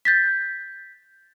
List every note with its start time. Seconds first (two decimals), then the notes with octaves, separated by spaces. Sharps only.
0.05 G6 A6 B6